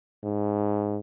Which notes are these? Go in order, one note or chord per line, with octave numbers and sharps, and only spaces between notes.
G#2